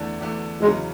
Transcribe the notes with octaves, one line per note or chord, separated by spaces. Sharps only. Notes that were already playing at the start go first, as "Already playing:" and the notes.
Already playing: E2 D3 A3 D4
E2 D3 A3 D4
E2 C#3 F#3 G#3 C#4